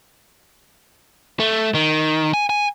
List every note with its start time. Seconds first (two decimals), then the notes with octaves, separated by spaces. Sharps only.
1.40 A3
1.75 D#3
2.34 G#5
2.50 G#5